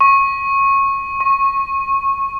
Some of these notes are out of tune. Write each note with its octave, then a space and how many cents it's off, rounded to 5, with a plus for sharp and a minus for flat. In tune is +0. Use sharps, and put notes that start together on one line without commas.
C#6 -20
C#6 -30